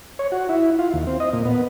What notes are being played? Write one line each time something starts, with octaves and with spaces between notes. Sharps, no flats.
C#5
F#4
E4
F4
D#2
C4
D#5
A#2
B3